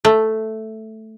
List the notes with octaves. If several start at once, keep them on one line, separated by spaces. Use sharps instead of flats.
A3